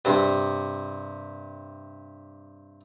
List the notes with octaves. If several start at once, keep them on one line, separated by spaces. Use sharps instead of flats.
G2 C3